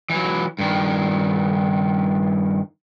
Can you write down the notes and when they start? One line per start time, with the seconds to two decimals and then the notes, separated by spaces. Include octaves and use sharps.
0.10 E3 F#3
0.59 G2 D#3